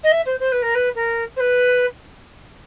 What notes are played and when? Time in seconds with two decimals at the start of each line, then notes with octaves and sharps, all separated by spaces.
0.03 D#5
0.11 E5
0.25 C5
0.39 C5
0.51 B4
0.62 A#4
0.74 B4
0.94 A#4
1.36 C5
1.39 B4